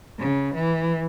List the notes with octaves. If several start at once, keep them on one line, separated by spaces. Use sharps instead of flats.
C#3
E3